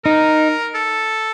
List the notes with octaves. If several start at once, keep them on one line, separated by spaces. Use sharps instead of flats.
D#4 A#4
A4